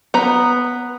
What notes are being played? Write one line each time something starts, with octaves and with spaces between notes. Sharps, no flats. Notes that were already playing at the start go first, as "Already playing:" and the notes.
B3 A#5